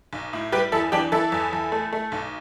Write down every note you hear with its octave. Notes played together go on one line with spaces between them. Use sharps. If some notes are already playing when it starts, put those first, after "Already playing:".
B1
A2
G3 G4 B4
E2 E4 A4
E3 D4 G4
E3 E4 A4
E2
E2
A3
A3
B1